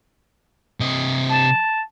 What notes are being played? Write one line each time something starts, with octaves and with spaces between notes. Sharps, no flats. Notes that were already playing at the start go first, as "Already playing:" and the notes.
C3 D#5
A5